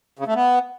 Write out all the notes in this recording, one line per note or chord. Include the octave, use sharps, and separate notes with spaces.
C#3
A3
B3